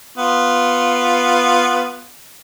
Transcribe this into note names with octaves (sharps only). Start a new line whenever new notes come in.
B3 F4